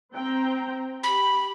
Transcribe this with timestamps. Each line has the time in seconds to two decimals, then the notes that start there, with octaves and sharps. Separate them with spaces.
0.14 C4 G5 A#5
1.03 G4 B5